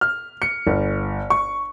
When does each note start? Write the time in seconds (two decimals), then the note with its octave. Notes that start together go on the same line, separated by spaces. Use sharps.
0.01 F6
0.42 C#7
0.67 G1
1.30 C#6